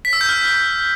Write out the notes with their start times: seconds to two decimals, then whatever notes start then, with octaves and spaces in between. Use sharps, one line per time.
0.05 B6
0.13 E6
0.21 G6
0.29 F6